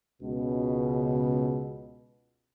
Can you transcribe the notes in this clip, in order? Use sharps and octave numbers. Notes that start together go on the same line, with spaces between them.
C#2 B2